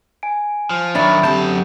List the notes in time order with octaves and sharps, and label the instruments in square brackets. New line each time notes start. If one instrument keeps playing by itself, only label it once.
[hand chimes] G#5 D7
[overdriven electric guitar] F3
[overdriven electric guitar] D#3 F#3 [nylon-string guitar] D4 C#5 D5 [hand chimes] E5 B5 A6
[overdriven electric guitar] F#2 A5 [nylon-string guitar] D3 C4 [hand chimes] G4 G6